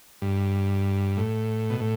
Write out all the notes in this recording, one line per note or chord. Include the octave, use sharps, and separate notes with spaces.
G2
A2
B2
A2